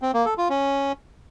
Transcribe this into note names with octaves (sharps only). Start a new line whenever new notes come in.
C4
A#3
A4
F4
C#4